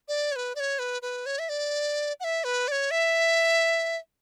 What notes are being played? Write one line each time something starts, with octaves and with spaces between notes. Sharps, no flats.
D5
C#5
B4
D5
C#5
B4
B4
C#5
E5
D5
F#5
E5
B4
D5
C#5
E5